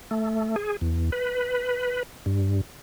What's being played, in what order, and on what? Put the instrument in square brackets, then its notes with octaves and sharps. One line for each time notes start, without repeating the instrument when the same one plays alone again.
[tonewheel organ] A3
G#4
E2
B4
G2